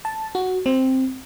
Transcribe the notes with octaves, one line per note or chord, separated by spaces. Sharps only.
A5
F#4
C4